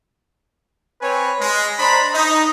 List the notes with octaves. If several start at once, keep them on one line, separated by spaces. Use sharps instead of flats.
C4 B4 C#5 G#5
G#3
D4 C5 A#5 B5
D#4